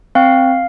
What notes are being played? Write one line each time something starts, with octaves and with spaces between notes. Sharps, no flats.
C4 F5